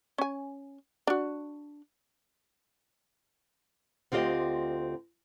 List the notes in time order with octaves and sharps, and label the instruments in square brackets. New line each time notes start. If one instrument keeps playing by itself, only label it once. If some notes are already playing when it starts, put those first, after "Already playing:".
[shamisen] C#4 G#5
D4 F#4
[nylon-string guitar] D2 C4 F4 G4 D#5